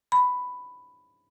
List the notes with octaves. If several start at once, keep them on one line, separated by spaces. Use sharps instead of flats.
B5